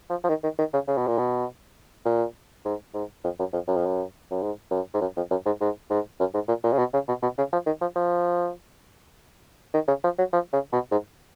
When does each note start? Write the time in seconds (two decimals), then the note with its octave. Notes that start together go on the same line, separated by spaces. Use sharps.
0.09 F3
0.24 F3
0.29 D#3
0.43 D#3
0.59 D#3
0.73 C#3
0.88 C#3
0.98 B2
1.07 A#2
1.18 B2
2.05 A#2
2.65 G#2
2.94 G#2
3.24 F2
3.39 F#2
3.53 F2
3.68 F#2
3.76 F2
3.85 F#2
4.31 F#2
4.42 G#2
4.71 F#2
4.94 G#2
5.01 F#2
5.16 F2
5.31 F#2
5.46 G#2
5.60 G#2
5.90 G#2
6.20 F#2
6.34 G#2
6.48 A#2
6.64 A#2
6.72 C#3
6.79 B2
6.94 C#3
7.08 B2
7.22 B2
7.38 C#3
7.53 F3
7.66 D#3
7.81 F3
7.96 F3
9.74 D#3
9.88 C#3
10.04 F3
10.18 F#3
10.33 F3
10.53 C#3
10.73 B2
10.92 G#2